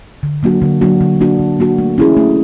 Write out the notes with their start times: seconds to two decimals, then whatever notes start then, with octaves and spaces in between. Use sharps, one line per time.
0.23 D3
0.43 F#3 A#3 D4 F#4
0.62 D3
0.81 F#3 A#3 D4 F#4
1.01 D3
1.21 F#3 A#3 D4 F#4
1.39 D3
1.59 F#3 A#3 D4 F#4
1.79 A3
1.98 C#4 E4 G#4
2.17 A3